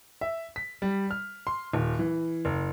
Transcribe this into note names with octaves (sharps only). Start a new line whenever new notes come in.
E5
B6
G3
F6
C6
D#1
E3
F#1